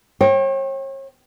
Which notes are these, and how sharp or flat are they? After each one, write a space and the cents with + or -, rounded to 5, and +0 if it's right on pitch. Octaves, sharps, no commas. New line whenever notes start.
C#5 -40 G5 +0